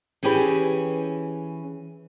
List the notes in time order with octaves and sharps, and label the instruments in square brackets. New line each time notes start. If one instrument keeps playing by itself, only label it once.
[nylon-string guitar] E3 C#4 G4 G#4 B4